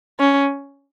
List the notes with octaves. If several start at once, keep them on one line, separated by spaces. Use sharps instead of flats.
C#4